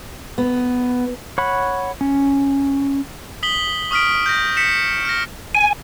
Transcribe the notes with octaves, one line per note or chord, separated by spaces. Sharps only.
B3
C#5 F#5 B5
C#4
D#6 B6 F#7 G7
C#6 D#6 F6 B6 D7
G6 A#6
B6 C#7 E7
F6 A#6
G#5